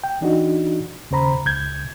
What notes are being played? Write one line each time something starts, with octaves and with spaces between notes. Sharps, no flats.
G5
E3 D4 D#4 F#4
D#2 C#3 C5 A#5 B5
C#2 G6 G#6